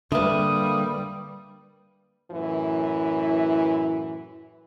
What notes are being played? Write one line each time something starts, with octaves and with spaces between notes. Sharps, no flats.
D3 G3 A#3 B4 E5 D#6
F#2 A2 E3 E4